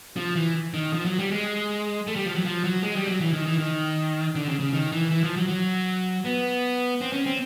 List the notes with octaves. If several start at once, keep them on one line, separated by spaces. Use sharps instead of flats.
F3
E3
D#3
F3
F#3
G3
G#3
A3
G3
F3
F#3
F3
F#3
G#3
G3
F#3
E3
D#3
E3
D#3
D3
C#3
C#3
D#3
E3
E3
F3
F#3
F#3
B3
C4
C#4
C4